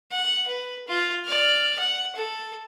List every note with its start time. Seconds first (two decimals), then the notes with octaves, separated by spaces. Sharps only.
0.11 F#5
0.47 B4
0.88 F4
1.25 D5 F6
1.79 F#5
2.16 A4